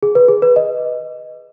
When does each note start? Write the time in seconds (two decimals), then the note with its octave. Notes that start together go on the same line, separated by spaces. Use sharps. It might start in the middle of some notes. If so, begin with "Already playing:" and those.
0.03 G#4
0.15 B4
0.28 G#4
0.42 B4
0.56 D#5